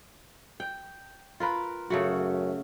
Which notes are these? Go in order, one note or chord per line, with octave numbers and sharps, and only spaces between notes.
G5
F4 A#4 B4
F#2 C#3 A3 F#4